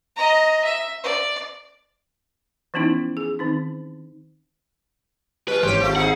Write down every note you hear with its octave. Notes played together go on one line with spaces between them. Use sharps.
D#5 A#5
E5
D5
E3 F3 B3 C#4 D#4 E4
G#4
D#3 C4 D#4
G3 B4
G#1 G#2 E3 G4 C5 C#5
G#1 F3 A3
D#4 G#4 F#5